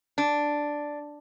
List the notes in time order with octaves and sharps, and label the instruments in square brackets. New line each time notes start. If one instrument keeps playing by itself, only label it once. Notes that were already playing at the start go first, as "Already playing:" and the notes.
[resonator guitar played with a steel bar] D4